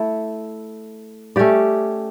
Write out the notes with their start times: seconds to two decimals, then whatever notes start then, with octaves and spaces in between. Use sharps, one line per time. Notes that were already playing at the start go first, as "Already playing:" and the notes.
Already playing: A3 E4 A4
1.36 A3 C#4 G4 D5